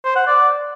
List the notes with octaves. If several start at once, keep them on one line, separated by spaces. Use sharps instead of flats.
C5
F#5
D5